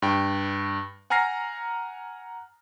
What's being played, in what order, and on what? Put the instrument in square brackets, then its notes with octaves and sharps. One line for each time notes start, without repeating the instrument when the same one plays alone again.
[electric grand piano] G2 G5
F#5 G#5 A#5 F6 A#6 C7